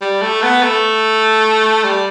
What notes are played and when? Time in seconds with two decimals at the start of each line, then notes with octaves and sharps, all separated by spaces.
0.01 G3
0.22 A3
0.42 B3
0.62 A3
1.84 G3